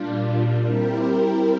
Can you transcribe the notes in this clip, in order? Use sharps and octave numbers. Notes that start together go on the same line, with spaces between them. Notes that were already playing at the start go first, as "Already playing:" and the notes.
Already playing: A#2 G3 D4 F4
G3 C4 E4 G4 A#4